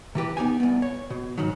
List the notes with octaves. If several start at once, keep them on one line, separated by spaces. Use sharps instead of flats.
C3 E3 G4 B4
B3 D#4 G4 G#5
C2 B3
C#5
B2
G#2 D#3 F#3